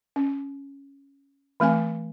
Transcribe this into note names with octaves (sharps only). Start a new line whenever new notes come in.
C#4
E3 A3 C4 G#5